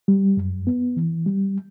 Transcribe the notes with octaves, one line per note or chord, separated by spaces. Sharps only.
G3
F#2
B3
E3
G3